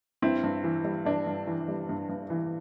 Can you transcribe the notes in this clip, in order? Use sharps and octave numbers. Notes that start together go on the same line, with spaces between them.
G2 C4 E4
G2
E3
G3
G2 D4
G2
E3
G3
G2
G2
E3